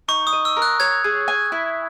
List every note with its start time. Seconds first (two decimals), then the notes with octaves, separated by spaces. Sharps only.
0.08 D#4 C#6
0.27 D#6
0.33 D#5
0.45 E6
0.56 A#4
0.62 F#6
0.80 C#5 G#6
1.04 G#4
1.28 G#5
1.52 E4